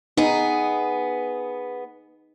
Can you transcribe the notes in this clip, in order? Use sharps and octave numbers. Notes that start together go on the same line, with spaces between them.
B3 D#4 G#4